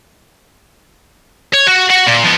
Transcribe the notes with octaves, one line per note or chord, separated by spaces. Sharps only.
C#5
F#4
F#4 F#5
A#2
F3 B3